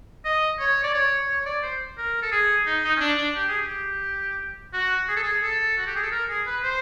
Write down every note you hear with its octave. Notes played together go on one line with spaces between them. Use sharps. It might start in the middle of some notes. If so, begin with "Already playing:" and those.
D#5
C#5
D5
C#5
C#5
C#5
D5
C5
A#4
A4
G#4
D#4
D#4
C#4
D4
D4
G4
G#4
G4
F#4
G#4
A4
G#4
A4
F#4
G4
G#4
A4
A#4
G#4
B4
C5